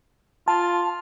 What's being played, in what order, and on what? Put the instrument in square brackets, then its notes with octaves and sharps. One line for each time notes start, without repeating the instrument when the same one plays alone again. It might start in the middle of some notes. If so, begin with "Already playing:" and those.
[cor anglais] F4 [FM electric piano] A5